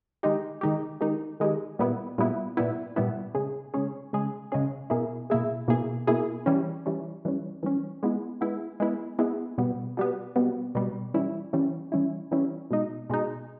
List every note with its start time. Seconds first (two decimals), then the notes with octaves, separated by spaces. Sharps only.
0.23 D#3 G#3 D#4 G4
0.61 D#3 G#3 D#4 G4
1.01 D#3 G#3 D#4 G4
1.40 D#3 G#3 D#4 G4
1.79 A#2 G3 B3 E4
2.18 A#2 G3 B3 E4
2.57 A#2 G3 B3 E4
2.96 A#2 G3 B3 E4
3.35 C#3 G#3 C#4 G#4
3.74 C#3 G#3 C#4 G#4
4.13 C#3 G#3 C#4 G#4
4.52 C#3 G#3 C#4 G#4
4.90 B2 A#3 E4 G#4
5.30 B2 A#3 E4 G#4
5.68 B2 A#3 E4 G#4
6.07 B2 A#3 E4 G#4
6.46 E3 G3 C#4
6.86 E3 G3 C#4
7.25 E3 G3 C#4
7.63 E3 G3 C#4
8.03 G#3 B3 E4
8.41 G#3 B3 E4
8.80 G#3 B3 E4
9.19 G#3 B3 E4
9.58 B2 G3 B3
9.97 B2 G3 B3
10.36 B2 G3 B3
10.75 B2 G3 B3
11.14 E3 G3 C#4 E4
11.53 E3 G3 C#4 E4
11.92 E3 G3 C#4 E4
12.31 E3 G3 C#4 E4
12.71 B2 G#3 D#4
13.10 B2 G#3 D#4